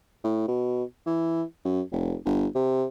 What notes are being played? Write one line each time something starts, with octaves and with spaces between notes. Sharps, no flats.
A2
B2
E3
F#2
F1
G1
C3